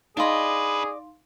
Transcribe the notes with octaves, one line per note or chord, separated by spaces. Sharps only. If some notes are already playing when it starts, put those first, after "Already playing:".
D4 D#4 G#4 B4 D5 D#5 F5 C6